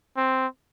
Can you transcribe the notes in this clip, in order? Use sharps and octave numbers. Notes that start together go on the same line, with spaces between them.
C4